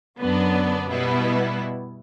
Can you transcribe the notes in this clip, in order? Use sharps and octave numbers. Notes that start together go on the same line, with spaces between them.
F#2 D3 F#3 B3 D4
B2 G3 B3 E4